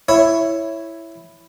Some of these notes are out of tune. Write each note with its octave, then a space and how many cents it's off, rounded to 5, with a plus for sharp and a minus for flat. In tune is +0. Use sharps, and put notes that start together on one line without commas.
E4 +5 C#5 +0